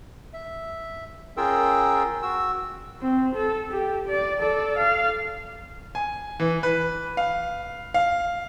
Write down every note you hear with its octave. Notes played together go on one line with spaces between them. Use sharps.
E5
C#4 F4 G#4 A#4 G5 E6
F#4 E6
C4
A4
G4
D5
A4 D5
F5
G#5
E3
B4
F5
F5